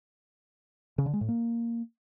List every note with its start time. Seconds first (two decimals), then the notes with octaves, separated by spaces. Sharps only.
0.98 C#3
1.06 D3
1.13 G#3
1.21 A2
1.29 A#3